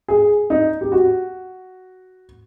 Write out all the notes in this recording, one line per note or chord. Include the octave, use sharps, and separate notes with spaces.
G#4
D#4
G4
F#4